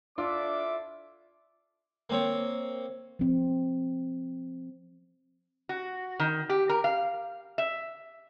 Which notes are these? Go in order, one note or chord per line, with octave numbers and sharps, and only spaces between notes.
D4 E4 F4 A4 E5 D6
A#3 C4 C#5
F3 C4
F#4
D#3
G4
A#4
F5
E5